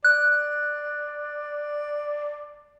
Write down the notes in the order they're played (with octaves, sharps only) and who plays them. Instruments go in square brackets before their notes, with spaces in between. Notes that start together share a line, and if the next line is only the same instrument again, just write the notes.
[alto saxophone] D5 [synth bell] F#6